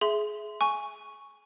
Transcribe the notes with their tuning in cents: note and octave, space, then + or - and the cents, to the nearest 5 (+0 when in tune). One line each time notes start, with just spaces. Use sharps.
G#4 +20 E5 +0 C6 -20
G#5 +0 C#6 +0